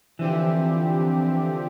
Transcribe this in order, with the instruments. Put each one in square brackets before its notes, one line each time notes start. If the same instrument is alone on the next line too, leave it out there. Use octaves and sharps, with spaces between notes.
[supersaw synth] D3 F3 C4 G4 [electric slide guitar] E3